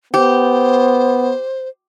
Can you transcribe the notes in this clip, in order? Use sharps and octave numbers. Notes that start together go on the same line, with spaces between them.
B3 G4 C5